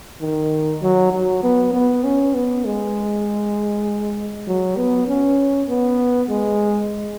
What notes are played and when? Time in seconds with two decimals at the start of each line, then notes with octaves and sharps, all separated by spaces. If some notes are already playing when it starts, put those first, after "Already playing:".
0.21 D#3
0.82 F#3
1.13 F#3
1.43 B3
1.74 B3
2.04 C#4
2.35 B3
2.65 G#3
4.47 F#3
4.77 B3
5.08 C#4
5.69 B3
6.30 G#3